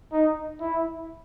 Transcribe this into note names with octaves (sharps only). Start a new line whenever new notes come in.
D#4
E4